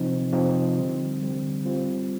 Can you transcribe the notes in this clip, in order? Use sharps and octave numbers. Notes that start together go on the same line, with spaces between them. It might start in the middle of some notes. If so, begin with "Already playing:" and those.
Already playing: C3 F3 C4 D#4
C3 F3 C4 D#4
D3 G3 C4
D3 G3 C4
G3 C4 F4